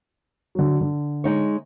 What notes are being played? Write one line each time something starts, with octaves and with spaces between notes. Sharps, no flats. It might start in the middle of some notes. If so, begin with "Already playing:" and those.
D3 F#3
D3
G#3 D#4 C#5